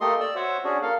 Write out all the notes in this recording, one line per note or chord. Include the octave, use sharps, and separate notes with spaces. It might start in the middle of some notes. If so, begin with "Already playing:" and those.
A3 A#3 G4 A4 D#5 C6
D5 E6
F#4 C5 C#5 E5
C#4 D4 F#4 G#4
A#3 A4 F5